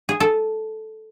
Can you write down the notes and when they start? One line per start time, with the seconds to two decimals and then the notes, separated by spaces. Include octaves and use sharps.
0.09 G#4
0.20 A4